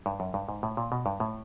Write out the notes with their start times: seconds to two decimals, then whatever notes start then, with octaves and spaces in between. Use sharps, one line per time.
0.06 G2
0.20 F#2
0.34 G2
0.49 G#2
0.63 A2
0.77 A#2
0.92 B2
1.06 G2
1.20 A2